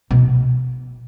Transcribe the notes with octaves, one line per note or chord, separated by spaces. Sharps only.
B2